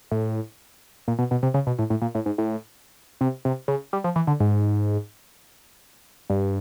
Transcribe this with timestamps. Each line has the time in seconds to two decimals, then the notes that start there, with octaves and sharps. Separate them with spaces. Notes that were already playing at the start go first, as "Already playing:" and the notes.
0.11 A2
1.08 A#2
1.19 B2
1.31 B2
1.43 C3
1.54 C#3
1.67 B2
1.79 A2
1.90 A2
2.02 A#2
2.15 A2
2.26 G#2
2.38 A2
3.21 C3
3.45 C3
3.68 C#3
3.93 G3
4.04 F3
4.16 E3
4.27 D3
4.40 G#2
6.30 G2